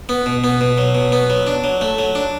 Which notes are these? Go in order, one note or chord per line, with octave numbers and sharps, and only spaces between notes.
B3
B2
B3
B2
F#3
B2
B3
F#3
D4
F#3
A3
F#3
D4